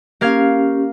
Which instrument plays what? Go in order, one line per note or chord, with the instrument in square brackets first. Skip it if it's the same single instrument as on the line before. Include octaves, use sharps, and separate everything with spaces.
[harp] A#3 F5 G#6 [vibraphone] C#4 G4